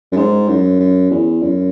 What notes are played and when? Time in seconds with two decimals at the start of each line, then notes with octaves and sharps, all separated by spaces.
0.12 F#2
0.16 G#2
0.48 F#2
0.80 F#2
1.11 E2
1.42 F#2